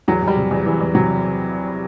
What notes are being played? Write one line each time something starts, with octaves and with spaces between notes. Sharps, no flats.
E2 F#3
E2
G3
C3
E2
E2 E3
E2
C3 F#3